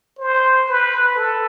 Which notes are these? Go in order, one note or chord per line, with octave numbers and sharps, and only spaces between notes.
C5
B4
A4